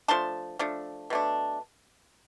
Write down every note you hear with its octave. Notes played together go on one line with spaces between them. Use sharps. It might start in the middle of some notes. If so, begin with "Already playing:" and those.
F3 A3 D4 A5 C6
F3 A3 D4
B2 A3 D4